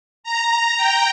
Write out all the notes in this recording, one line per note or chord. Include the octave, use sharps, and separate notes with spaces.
A#5
G5